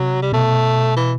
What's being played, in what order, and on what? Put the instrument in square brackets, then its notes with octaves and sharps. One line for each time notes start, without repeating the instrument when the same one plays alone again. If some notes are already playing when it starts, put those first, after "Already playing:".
Already playing: [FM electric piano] C3 [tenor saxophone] F#3
[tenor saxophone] G3
[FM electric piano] B2 [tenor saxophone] A3
[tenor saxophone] E3